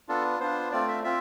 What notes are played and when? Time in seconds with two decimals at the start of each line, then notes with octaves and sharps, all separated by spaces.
0.08 B3 D4 F4 A4
0.40 B3 D4 F4 C5
0.72 A3 C4 F4 D5
0.88 E5
1.04 C4 F4 E5